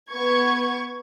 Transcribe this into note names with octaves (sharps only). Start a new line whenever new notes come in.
B3 C#6 G#6